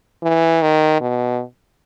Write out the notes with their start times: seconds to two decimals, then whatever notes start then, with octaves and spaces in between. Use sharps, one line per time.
0.23 E3
0.62 D#3
1.01 B2